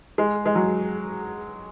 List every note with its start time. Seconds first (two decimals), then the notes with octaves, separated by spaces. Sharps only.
0.18 G#3
0.46 G#3
0.55 F#3